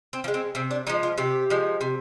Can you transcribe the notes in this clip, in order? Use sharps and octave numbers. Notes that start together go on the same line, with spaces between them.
C4
F3
G#3
C4
C3 C4
D4
F3 G#3 D#4
F4
C3 G4
F3 G#3
C3